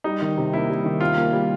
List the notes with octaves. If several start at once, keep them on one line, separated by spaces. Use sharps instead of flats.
G3 D#4
D#3
C3
A#3 E4
G3
D#3
C3 F4
A#3
G3